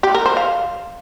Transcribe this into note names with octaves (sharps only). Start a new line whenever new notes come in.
G4
A#4
C5
F5